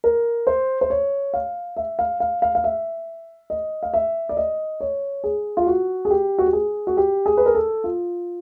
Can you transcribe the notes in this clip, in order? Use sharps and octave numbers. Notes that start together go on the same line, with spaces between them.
A#4
C5
C5
C#5
F5
E5
F5
F5
F5
F5
E5
D#5
F5
E5
D5
D#5
C#5
G#4
F4
F#4
G#4
G4
F#4
G4
G#4
F#4
G4
G#4
B4
A#4
A4
F4